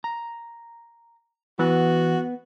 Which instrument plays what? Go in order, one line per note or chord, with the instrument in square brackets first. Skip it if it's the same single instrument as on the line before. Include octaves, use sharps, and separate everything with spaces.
[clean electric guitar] A#5
[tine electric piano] E3 [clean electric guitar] B3 [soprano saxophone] F#4